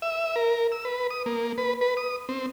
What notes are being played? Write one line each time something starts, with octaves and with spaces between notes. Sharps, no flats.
E5
A#4
E6
B4
D#6
A#3
B4
B4
D#6
C4